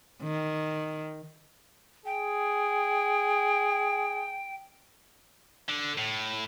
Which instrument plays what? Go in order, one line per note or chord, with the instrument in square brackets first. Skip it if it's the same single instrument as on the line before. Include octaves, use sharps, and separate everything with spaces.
[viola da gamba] D#3
[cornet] G#4 [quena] G5
[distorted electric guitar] D3
A2